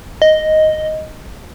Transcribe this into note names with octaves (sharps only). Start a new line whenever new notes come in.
D#5